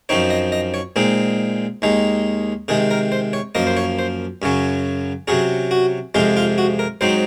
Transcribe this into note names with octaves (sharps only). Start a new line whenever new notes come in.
F#2 F3 C4 D#4 C#5
D#5
D#5
C#5
A#2 G#3 C4 D#4
D#2 D#3 G#3 D#4
C3 D#3 G#3 G#4
A#4
C5
C#5
F#2 F3 A#3 D#5
C5
C#5
C5
F#2 C#3 F#3 C#4
C3 F#3 C#4 G#4
F#4
F2 C3 F3 G#3 F4
F4
F#4
A#4
G#2 F#3 C4 D#4 C5